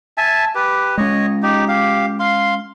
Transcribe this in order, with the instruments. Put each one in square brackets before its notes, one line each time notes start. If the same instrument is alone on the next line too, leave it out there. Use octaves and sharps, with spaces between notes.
[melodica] E5 G#5 A5
G4 B4
[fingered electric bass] G#3 C#4 [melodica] C#5 D#5
[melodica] D#4 G4
G4 F5
F5 C6